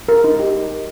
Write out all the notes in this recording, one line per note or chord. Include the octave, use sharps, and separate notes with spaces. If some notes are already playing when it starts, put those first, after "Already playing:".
A#4
D#4
G4